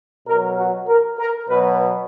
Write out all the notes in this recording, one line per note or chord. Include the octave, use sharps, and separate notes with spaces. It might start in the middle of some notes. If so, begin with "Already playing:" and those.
B2 F#3 A#4
F#4
A#4
A#4
B2 F#3 B4